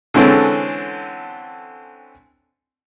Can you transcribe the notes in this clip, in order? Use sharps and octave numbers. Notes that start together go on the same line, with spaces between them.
D3 E3 G#3 C4 C#4 A4